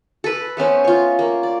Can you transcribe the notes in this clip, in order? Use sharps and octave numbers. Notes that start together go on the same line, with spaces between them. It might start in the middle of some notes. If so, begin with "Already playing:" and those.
A4 B4
A3 B3 C#4 C5
F4 C#5
A#3
D5